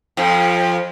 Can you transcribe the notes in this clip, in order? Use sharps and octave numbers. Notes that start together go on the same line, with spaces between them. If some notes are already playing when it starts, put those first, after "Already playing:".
F2 F3